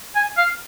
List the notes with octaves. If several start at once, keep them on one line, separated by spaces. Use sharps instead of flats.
G#5
F5